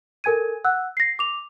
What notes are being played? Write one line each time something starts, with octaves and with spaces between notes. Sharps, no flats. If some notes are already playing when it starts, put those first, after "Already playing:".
A4 A#4 G#5 G#6 D#7
F#5 E6 F#6
A#6 C7
D6 F7